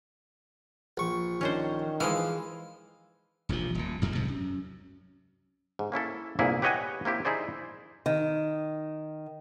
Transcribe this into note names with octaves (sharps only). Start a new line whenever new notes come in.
A#1 C#6
D#3 C#4 D4 C5
E3 F3 G#3 F5
E1 A#1 D#2 F3
D#1 A#2
A1 F2 F#3
C2 G#2 C3
F#2
G#2
A#3 C#4 E4 A4
G1 C2 A#2 A#3 E4 G#4
G4 B4 C#5 D#5 F#5 G#5
A#3 C4 E4 G4
D#4 E4 G#4 C5 D5
D#3